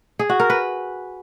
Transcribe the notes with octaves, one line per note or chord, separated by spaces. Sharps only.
G#4
F#4
A#4
B4